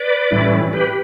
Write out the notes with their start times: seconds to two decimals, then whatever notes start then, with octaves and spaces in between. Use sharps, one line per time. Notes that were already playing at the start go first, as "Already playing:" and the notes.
Already playing: B4 D5
0.31 A2 E3 G3 C#4 E4
0.73 G4 B4